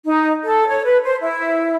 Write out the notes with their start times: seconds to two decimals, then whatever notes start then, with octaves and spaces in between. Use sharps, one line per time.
0.05 D#4
0.43 A4
0.68 C#5
0.85 B4
1.05 C5
1.22 E4